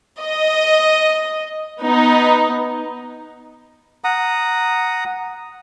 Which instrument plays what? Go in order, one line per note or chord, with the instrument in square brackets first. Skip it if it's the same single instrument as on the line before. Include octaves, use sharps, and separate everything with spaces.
[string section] D#5
B3 D#4
[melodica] F#5 A#5 D#6